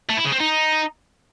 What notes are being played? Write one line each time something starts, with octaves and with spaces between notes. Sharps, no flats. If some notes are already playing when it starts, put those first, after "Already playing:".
A3
E4
C#3
C4
D#4